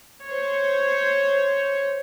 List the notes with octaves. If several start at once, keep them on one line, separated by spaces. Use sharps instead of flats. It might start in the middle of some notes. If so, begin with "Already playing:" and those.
C5 C#5